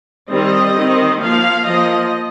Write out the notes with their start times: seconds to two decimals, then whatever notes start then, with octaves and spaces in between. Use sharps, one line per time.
0.29 D#3 G3 C4 D#5
0.75 D#3 C4
1.19 F3 A#3 F5
1.65 F3 A#3 D#5